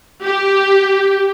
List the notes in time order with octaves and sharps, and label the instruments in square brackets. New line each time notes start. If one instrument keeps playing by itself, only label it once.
[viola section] G4